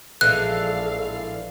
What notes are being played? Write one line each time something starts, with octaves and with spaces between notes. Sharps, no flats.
A#1 E3 G#3 D4 A4 F5 F#6